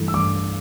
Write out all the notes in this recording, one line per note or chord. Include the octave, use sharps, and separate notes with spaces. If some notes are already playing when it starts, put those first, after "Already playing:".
Already playing: G2 E3 A3
E6
G2 D6